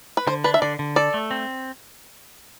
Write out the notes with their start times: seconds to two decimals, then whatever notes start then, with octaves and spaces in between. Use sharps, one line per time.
0.17 B4
0.27 D3 C5
0.44 D4 B4
0.54 E5
0.62 D3 D5
0.79 D3
0.96 A4 D5
1.14 A3
1.31 C4